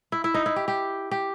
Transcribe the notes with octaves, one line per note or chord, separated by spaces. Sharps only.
E4
E4
D#4
E4
G4
G4
G4